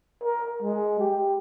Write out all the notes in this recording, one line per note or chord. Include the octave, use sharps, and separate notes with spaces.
A#4
G#3
G4